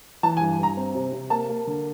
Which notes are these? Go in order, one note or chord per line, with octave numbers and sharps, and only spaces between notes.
E3 A5
G#5
G2
G2 A#5
C4
C3
C3
A#3 A5
A#3
D3